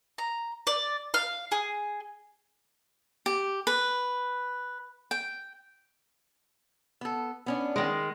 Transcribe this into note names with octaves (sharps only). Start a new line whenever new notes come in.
A#5
D5
F5
G#4
G4
B4
G5
B3 A4
B3 C#4 D4
D#3 G#3